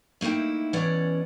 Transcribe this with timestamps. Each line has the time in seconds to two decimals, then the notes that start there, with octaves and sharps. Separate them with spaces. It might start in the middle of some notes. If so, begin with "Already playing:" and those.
0.21 A3 A#3 D#4 E4 G5
0.73 B2 E3 C#4 D5 F#5